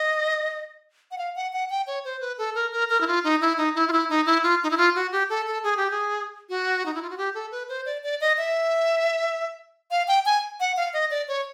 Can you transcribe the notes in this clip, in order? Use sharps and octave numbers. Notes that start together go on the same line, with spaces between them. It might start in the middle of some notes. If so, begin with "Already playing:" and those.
Already playing: D#5
F#5
F5
F#5
F#5
G5
C#5
C5
B4
A4
A#4
A#4
A#4
E4
F4
D#4
E4
D#4
E4
F4
E4
D#4
E4
F4
D#4
E4
F4
F#4
G4
A4
A4
G#4
G4
G#4
F#4
D#4
E4
F4
F#4
G4
A4
B4
C5
D5
D5
D#5
E5
F5
G5
G#5
F#5
F5
D#5
D5
C#5